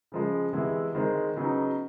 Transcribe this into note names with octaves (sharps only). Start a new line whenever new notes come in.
C#3 F3 G#3
C3 E3 G#3 B3 E4
D#3 G#3 C4
C#3 F#3 B3 D#4